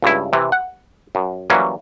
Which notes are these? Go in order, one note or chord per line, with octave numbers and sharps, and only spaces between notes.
C#2 G2 E4
C3 E3
F#5
F#2
E3 F#3 G3 A#3 C#4